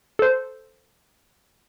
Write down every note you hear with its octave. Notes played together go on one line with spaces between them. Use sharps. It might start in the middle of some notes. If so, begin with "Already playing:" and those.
A4 C5